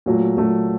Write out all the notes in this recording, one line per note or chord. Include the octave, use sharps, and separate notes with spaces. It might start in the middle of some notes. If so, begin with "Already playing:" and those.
A#2 F#3 A3
A#2 F#3 A3